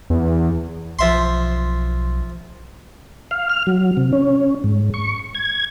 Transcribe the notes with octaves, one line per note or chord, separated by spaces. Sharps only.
E2
B1 F3 E5 C6
F5
F6
F#3
C3
C#4
G#2
C#6
G#6